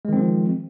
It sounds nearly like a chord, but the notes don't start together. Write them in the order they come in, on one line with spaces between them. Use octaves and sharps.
G#3 D#3 C4 F3